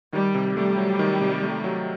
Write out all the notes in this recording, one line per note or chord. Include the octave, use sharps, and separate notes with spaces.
D#3 G3
C3
G3 A3
F#3
D#3
C3
A3
F#3